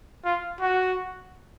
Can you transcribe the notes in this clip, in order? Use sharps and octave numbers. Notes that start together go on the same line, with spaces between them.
F4
F#4